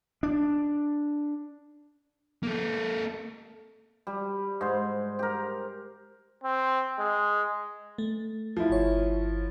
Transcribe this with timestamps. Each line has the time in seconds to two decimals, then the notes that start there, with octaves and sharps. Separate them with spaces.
0.23 D4
2.43 A#3 A4
4.07 G3
4.61 G#2 C5
5.19 G4 A#4
6.44 C4
6.99 G#3
7.98 A3
8.57 F3 E4
8.70 G1 C#5